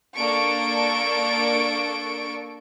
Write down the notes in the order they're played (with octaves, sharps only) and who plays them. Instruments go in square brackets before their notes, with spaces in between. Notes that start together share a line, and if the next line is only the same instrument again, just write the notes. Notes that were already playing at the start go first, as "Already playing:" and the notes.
[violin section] A#3 D4 A4 C#6 D7